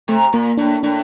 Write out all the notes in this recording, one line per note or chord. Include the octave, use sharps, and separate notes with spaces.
C3 A3
A#2 A#3
A2 D4
A2 D4